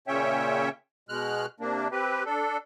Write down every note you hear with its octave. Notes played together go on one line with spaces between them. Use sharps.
A#2 C#3 C#4 C#5 E5 G5
B2 G#3 F6 F#6
C3 A#3 D4
C4 G4 B4
D4 A4